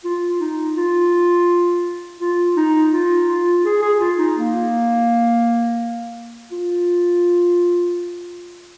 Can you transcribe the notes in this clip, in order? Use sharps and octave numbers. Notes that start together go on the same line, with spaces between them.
F4
D#4
F4
F4
D#4
F4
F4
G#4
G#4
F4
D#4
A#3
F4